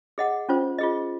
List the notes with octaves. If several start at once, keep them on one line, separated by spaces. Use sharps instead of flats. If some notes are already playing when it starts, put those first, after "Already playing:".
G#4 D#5 F#5
C#4 F4 C5
F4 G#4 D#5